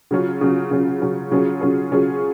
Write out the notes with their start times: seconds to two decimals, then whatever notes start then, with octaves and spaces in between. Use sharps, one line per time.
0.11 C#3 F#3 C#4 F4
0.41 C#3 F#3 C#4 F4
0.71 C#3 F#3 C#4 F4
1.01 C#3 F#3 C#4 F4
1.31 C#3 F#3 C#4 F4 G#4
1.61 C#3 F#3 C#4 F4 G#4
1.91 C#3 F#3 C#4 F4 G#4